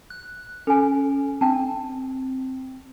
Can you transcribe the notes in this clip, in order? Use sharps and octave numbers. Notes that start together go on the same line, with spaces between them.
F#6
C#4 A4 G#5
C4 D4 G5 A5